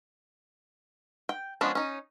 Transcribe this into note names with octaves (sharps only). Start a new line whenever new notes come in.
G5
F3 G#3 B3 C#4 D4
C#4 D#4